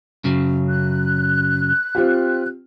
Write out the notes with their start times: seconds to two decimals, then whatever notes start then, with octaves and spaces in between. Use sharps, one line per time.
0.24 F#2 C#3 F#3
0.69 F#6
1.95 C4 F4 G4